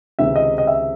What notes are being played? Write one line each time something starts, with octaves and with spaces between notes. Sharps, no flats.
C#2 C3 D#3 E5
D#5
D#5
E5